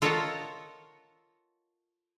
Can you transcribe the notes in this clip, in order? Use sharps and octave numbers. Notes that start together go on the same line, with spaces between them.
F4 A4 A#4 C#5 D#5 F#5